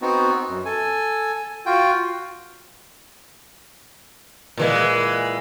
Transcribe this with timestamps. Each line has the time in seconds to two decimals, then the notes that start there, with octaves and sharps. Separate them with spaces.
0.02 B3 C4 D#4 F#4
0.49 F#2
0.65 A4 G#5
1.66 F4 F#4 G5
4.57 A#2 E3 G#3